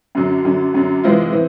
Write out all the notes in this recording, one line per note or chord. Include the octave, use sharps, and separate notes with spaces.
F#2 D3 F#3
F#2 D3 F#3
F#2 D3 F#3
C3 E3 G#3 C4 F4
E3 C4